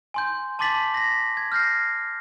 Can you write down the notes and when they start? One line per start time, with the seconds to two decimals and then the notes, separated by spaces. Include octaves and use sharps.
0.14 G#5 C6 G6
0.59 A5 C6 D6 A6 B6 F#7
0.94 A#6 B6
1.37 G#6
1.52 F6 G6 A#6 C7